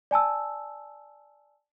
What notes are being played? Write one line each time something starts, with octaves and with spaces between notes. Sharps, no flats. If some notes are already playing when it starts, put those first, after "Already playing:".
D5 G#5 A5 E6